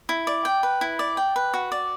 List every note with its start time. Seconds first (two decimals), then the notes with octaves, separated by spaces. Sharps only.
0.09 E4
0.27 D5
0.45 G5
0.63 B4
0.81 E4
0.99 D5
1.17 G5
1.36 B4
1.54 F#4
1.72 D5